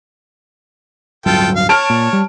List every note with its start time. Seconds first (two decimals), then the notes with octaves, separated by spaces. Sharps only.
1.26 D1 G2 F#3 F4 A4 G5
1.56 F5
1.69 C#5 A5 F6 D7
1.90 A#2
2.13 G3